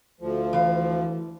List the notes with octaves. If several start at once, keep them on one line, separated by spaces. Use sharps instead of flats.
D2 F3
E3 F5